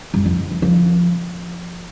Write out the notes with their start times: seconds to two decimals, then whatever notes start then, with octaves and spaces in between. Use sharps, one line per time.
0.14 G2
0.26 F2
0.51 E3
0.62 F3